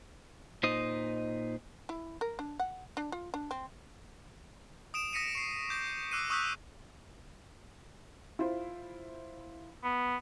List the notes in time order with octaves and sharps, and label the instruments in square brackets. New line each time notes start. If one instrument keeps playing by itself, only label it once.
[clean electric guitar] A#2 D#4 C5 D#5
[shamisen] E4
A#4
D4
F#5
D4
F4
D4
C4
[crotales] D#6 D7 E7
D#6 A#6 B6 C#7 D#7
C#6 C7
D6 G6 A#6
D6 E6 F#6 C7 D#7
C#6 D#6 E6 F#6 G6 B6
[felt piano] E4 F4 C5
[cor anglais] B3